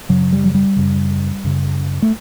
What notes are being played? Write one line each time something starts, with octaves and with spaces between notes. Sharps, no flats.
F#2 C#3 F#3
G3
F#3
G3
F#2 C#3
F#2 C#3
A3